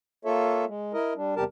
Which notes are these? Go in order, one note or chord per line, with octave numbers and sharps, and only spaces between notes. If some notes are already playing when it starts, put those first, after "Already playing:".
A#3 F4 A4 C#5 E5
G#3
E4 A#4 D#5
G3 D4
E2 C3 G3 G4 A#4 A5